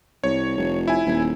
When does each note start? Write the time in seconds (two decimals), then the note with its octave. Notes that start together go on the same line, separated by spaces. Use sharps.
0.24 C2 C#5
0.57 F1
0.88 E4 G#5
1.06 D#1